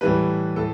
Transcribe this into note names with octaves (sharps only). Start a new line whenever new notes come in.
A2 E3 G3 B4
A2 A4